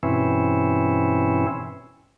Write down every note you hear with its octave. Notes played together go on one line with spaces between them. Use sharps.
G2 B2 E3 C4 C#4 E4